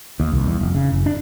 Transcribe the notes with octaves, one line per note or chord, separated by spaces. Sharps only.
D#2
C2
E2
F1
C#3
F#1
D4